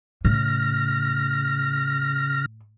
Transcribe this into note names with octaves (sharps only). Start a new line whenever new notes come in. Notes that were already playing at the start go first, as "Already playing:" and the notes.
A2 C#3 F6 A#6